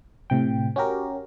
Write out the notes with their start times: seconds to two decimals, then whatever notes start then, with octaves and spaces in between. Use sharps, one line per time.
0.30 A2 C3 G5
0.76 C#4 F#4 G4 A#4